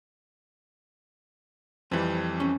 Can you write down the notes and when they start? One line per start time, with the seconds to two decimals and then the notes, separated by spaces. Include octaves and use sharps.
1.91 F2 E3 G3 C4 B5
2.40 C#4